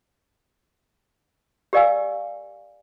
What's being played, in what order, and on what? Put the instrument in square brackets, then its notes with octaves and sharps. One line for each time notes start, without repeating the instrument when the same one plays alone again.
[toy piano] G4 A#4 D5 F5 G#5 E6